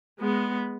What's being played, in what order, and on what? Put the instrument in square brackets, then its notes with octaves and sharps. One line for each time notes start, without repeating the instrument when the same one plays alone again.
[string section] G#3 [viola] B3